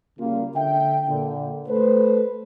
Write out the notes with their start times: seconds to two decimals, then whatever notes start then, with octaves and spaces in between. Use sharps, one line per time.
0.19 C#3 G3 A#3 F4
0.56 D3 E5 G5
1.09 A#2 D3
1.69 A3 A4 B4 C5